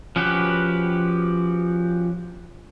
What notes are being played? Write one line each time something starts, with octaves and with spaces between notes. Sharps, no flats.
F3 C#4 F#4 G4 B4